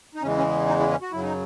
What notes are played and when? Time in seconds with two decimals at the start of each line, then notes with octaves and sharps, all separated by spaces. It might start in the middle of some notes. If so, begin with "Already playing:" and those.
0.15 D#4
0.22 E2 C#3 E3 G#3 C#4
0.38 C#4
0.68 D#4
0.80 E4
0.91 C#4
1.02 F#4
1.12 F#2 C#3 F#3 E4
1.23 D#4